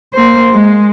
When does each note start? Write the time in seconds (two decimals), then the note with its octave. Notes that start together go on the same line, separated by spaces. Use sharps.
0.14 A#3 C5
0.52 G#3